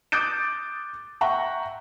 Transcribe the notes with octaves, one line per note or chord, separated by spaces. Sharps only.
D6 D#6 F#6 G6 A6 D7
E5 F#5 G5 A#5 C#6